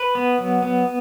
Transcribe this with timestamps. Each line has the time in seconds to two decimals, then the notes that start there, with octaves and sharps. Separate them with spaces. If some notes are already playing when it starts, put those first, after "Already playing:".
Already playing: B4
0.15 B3
0.38 F#3
0.62 B3